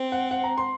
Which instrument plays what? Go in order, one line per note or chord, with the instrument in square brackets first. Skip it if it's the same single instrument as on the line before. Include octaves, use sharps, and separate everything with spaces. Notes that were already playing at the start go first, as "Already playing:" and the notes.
Already playing: [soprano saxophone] C4
[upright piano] F#5
F#5
A#5
C6